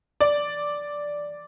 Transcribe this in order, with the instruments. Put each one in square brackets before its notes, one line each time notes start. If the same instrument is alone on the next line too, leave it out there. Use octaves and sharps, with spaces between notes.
[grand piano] D5